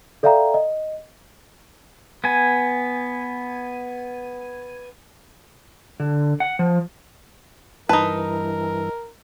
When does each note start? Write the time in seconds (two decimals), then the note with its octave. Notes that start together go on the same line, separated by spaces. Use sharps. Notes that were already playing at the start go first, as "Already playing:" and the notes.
0.23 A4 D5 E5 F5 G5 A#5
0.54 D#5
2.24 B3 G#5
6.00 D3
6.40 F#5
6.59 F3
7.89 G2 E3 D#4 A#4 B4 A5